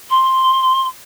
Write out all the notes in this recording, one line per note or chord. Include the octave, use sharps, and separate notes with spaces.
C6